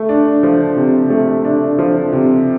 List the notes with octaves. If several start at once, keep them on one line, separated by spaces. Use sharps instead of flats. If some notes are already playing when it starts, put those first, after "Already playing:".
Already playing: A3
D4
F3
C3
A3
D4
F3
C3